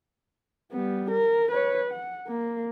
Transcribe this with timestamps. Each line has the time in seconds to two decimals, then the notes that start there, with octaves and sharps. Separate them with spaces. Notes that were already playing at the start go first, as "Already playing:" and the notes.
0.72 G3 B3
1.11 A#4
1.51 B4 C#5
1.91 F#5
2.28 A#3